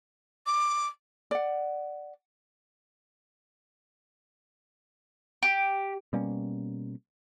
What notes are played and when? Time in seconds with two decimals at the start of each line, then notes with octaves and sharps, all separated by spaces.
0.46 D6
1.31 D5 F#5
5.43 G4
6.13 B2 G3 A#3 C#4